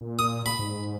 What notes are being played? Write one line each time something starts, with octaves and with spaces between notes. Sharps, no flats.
A#2
D#6
B5
G#2